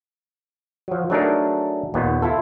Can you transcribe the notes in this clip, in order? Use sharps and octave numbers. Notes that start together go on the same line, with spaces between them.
F3 F#3
F#3 A3 D4 D#4 G#4 A#4
D#2 A#2 B3
E4 F4 A4